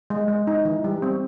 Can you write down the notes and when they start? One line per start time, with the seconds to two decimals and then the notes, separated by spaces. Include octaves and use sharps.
0.10 G#3
0.28 G#3
0.47 D#4
0.65 E3
0.84 G3
1.02 C4